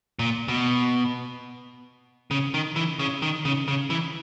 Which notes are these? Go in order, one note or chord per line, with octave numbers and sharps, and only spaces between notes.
A#2
B2
C#3
D#3
E3
C#3
D#3
C#3
C#3
E3